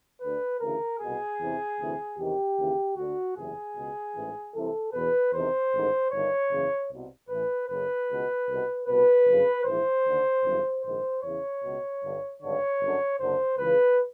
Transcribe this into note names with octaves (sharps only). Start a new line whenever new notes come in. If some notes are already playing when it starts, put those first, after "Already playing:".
D2 D3 B4
D2 C#3 E3 A#4
C2 B2 G#4
E2 C3 E3
D2 C3 E3
E2 C3 D#3 G4
D#2 C#3 E3
D2 D3 F#4
F#1 E2 C3 E3 G#4
C#2 B2
A1 G#2 E3
C2 C3 E3 A4
E2 B2 B4
E2 C3 D#3 C5
A1 G#2 D#3
G1 G2 D#3 C#5
F#1 E2 C#3 E3
C2 B2
A1 A2 E3 B4
F#1 F#2 C#3 B4
C#2 B2
C2 B2
C2 B2 B4
G1 F#2 C#3
A#1 G#2 E3 C5
D#2 D3
G1 F#2 C#3 E3
A#1 G#2 D#3 C5
E2 C#3 E3 C#5
C#2 B2
G1 G2 D3
G#1 G2 D3 C#5
G1 F#2 D3
F#1 F#2 D3 C5
C#2 C#3 E3 B4